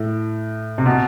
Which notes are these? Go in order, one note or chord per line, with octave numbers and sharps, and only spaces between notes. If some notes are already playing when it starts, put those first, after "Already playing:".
Already playing: A2
C3
B2